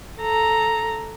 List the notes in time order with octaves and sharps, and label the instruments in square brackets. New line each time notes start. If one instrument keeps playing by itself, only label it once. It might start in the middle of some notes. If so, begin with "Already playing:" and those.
[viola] A4 A#5